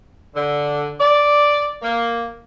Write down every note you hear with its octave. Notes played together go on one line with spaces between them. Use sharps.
D3
D5
A#3